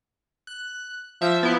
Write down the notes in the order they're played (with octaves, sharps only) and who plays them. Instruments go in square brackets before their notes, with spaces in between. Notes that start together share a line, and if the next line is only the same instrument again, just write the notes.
[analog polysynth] F#6
[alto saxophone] F3 [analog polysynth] E5
[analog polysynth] B3 E4